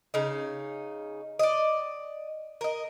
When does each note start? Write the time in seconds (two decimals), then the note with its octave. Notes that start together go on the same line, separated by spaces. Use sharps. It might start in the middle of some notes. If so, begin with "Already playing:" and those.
0.14 C#3 D#4
1.39 D5 D#5
2.61 A#4 D#5